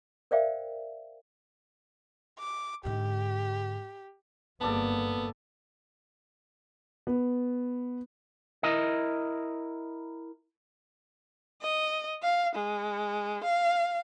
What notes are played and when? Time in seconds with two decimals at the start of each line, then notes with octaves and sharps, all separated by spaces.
0.31 A#4 C5 D5 E5 F5 G5
2.39 D6
2.85 G#2 D3 G4
4.61 G1 A#3 B3 A4 D5 A5
7.07 B3
8.63 E4 A#4 D#5
11.62 D#5
12.23 F5
12.55 G#3
13.44 F5